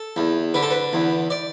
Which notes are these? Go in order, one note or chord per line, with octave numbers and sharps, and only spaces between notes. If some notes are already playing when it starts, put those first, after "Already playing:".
Already playing: A4
E2
D3 B4
A4
B4
E2
D5